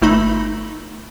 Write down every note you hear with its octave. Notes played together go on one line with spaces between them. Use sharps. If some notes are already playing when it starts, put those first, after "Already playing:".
G1 A3 D#4 B5